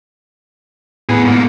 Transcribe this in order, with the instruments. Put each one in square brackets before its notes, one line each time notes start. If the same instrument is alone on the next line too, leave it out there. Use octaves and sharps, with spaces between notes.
[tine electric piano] A2 B3 [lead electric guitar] G#4 B4
[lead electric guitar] G#2 A#3